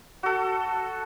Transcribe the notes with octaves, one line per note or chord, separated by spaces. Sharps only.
F#4 A4